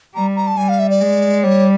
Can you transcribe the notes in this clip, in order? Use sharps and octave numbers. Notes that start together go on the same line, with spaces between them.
G3 A#5
A#5
A5
G3 G#5
F5
E5
D5
G#3
G3 C#5